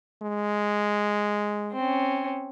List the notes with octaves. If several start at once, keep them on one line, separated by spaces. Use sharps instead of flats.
G#3
C4 C#4